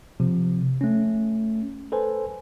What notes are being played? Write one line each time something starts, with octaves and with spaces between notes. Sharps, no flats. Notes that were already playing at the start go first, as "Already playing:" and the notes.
C3 F3
A3 C#4
A4 B4 C5 G#5